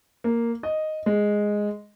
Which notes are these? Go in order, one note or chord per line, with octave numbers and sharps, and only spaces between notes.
A#3
D#5
G#3